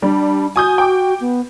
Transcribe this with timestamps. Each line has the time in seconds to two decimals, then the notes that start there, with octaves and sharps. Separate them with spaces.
0.02 G3 D4
0.56 F#4 G#5 D#6 G6
0.78 G5 D6
1.20 B3